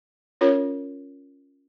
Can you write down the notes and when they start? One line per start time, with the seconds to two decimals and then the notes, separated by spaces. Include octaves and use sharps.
0.41 C#4 F4 A#4 C#5